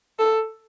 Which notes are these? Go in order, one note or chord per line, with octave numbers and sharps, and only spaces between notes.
A4